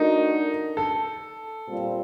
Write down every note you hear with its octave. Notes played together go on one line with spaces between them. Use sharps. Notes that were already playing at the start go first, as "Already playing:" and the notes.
Already playing: A3 D4 D#4 F#4 A#4
A4
A#2 G3 C4 F4